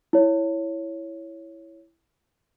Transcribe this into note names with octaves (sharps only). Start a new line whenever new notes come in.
E4 C#5